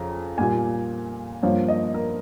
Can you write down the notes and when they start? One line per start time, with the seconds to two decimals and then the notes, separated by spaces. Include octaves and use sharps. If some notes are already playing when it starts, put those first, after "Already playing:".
Already playing: F2 C#3 A#5
0.38 A#2 G3 A#3 G#5
1.43 G2 F3 A#3 C#5
1.68 D#5
1.94 A#4